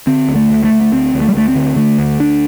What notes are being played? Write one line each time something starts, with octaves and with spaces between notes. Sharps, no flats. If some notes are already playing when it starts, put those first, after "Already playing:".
D3 C4
D2
A3
D2
A3
D2
A3
D2 C4
D2
A3
G3
D2 A3
C4
D3
D3 A3
D2
D2 D4